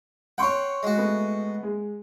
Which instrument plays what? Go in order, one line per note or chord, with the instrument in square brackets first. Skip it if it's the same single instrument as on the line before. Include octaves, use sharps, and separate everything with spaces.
[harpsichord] C#5 G5 [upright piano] F#5 C6 C#6
[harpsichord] G#3 F#4
[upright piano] A3 B3
G#3